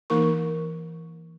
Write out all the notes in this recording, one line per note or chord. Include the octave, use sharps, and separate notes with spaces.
E3 A#3 D#4 A#4 C#6